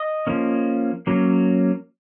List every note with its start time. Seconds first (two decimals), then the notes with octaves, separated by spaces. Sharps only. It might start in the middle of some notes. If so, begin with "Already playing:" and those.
Already playing: D#5
0.27 F3 A#3 C#4
1.07 F#3 A#3 C#4